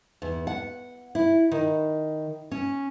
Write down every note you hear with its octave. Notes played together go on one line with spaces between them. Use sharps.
E2
F#5
E4
D#3
C#4